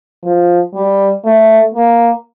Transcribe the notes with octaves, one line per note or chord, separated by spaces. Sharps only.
F3
G3
A3
A#3